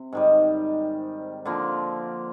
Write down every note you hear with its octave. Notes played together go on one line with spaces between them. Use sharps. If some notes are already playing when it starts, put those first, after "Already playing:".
Already playing: C3
G#2 D#3 G3
D3 F3 A#3